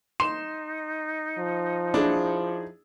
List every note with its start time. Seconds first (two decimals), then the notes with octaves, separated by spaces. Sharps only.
0.20 D#4 C6 E7
1.39 F3
1.94 D4 E4 G#4